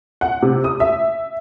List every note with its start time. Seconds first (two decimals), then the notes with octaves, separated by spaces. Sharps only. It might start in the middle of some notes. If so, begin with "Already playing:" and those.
0.21 F#5
0.42 C3
0.64 D#6
0.80 E5